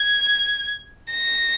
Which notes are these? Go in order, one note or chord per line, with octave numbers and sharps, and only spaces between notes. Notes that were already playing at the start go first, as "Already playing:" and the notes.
Already playing: G#6
A#6